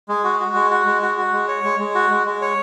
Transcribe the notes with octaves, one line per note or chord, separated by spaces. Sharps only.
G#3
F#4
F#4
G#3
F#4
G#3
F#4
F#4
G#3
C#5
G#3
G#3
F#4
G#3
G#3
C#5